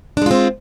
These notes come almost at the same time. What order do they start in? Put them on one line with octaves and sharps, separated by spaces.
D4 G#3 F4 C4